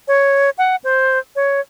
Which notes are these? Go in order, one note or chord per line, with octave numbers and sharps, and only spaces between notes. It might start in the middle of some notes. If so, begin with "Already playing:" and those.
C#5
F#5
C5
C#5